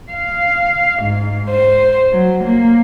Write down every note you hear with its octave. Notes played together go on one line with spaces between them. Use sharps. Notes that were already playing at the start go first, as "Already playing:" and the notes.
F5
G#2
C5
F#3
A#3